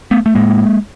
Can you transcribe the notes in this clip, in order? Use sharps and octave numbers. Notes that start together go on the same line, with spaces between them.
A3 B3
A3
A2 G#3 A#3